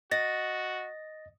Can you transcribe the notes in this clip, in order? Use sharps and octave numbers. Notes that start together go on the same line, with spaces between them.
F#4 D#5 A6 A#6